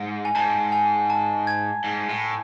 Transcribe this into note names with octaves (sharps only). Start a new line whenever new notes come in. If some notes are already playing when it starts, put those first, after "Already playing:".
Already playing: G#2
G#5
G#2 A5
G#5
A5
G#6
G#2
A2